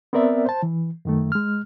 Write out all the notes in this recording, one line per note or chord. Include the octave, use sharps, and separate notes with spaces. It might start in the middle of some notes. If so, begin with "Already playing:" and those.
B3 C4 A#4 D5 E5
C5 A5
E3
F#2 D#3 A3
G#3 F6